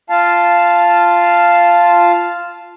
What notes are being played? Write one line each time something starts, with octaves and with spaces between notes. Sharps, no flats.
F4 F5 A5